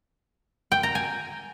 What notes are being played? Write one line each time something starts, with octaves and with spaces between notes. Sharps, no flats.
G5
A#5
G#5